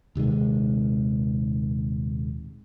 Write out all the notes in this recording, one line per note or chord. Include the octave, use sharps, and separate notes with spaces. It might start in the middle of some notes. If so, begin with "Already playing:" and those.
D#1 C3 D#3 G#3